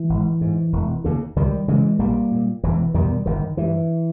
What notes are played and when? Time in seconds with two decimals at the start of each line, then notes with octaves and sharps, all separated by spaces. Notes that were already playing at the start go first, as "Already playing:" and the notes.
Already playing: E3
0.09 G#1
0.41 G#2
0.73 E1
1.04 D#2 C#3
1.36 C#2 D#3 G3
1.68 C#3 E3 G#3
1.99 A#1 G3 A#3
2.32 A#2
2.63 E1 E3
2.94 E2 B2 D#3 G3
3.26 G1 D#3
3.57 G2 E3